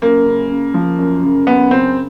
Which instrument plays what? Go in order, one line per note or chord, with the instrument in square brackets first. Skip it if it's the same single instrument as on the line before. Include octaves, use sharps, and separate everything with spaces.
[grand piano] F#2 [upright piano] A#3
[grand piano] C#3
C#3
F3
F#2
C#3
[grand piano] F#2 [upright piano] B3
[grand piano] C#3 [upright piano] C4